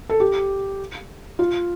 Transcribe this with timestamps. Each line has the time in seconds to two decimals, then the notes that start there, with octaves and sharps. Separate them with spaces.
0.10 A4
0.20 G4
1.39 F4